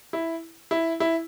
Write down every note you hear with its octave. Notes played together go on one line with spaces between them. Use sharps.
E4
E4
E4